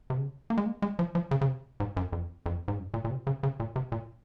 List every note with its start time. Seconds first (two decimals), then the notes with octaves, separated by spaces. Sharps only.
0.10 C3
0.17 C#3
0.50 A#3
0.58 G#3
0.66 A#3
0.82 G#3
0.99 F3
1.15 F3
1.31 C#3
1.41 C#3
1.48 C3
1.80 G#2
1.97 F#2
2.13 F2
2.46 F2
2.68 G#2
2.78 F#2
2.94 A#2
3.05 A#2
3.10 C3
3.27 C#3
3.43 C#3
3.60 A#2
3.76 C3
3.92 A#2